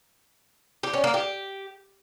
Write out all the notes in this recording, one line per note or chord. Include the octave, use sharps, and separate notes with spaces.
G4
C#4
A#3
G4